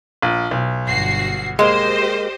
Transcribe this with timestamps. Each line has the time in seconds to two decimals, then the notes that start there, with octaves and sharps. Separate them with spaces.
0.22 A#1
0.51 B1
0.86 G1 F#4 C7
1.59 G#3 A#3 G4 C5 D#5